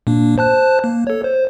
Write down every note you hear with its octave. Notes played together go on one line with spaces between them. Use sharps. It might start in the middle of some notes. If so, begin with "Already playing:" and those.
A#2 A#3 D4
C5 A5 F#6
A#3
A4 C#5
C5